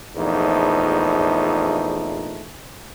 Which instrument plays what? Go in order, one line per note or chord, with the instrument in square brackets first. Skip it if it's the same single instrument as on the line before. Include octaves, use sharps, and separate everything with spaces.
[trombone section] A#1 E2 F3 A3 D#4